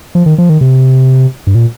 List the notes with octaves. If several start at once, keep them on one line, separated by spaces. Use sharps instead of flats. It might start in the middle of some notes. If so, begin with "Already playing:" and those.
F3
D#3
F3
D#3
C3
G2
A#2